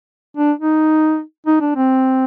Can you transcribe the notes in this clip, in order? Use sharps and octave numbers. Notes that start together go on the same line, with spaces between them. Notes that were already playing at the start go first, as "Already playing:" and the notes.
D4
D#4
D#4
D4
C4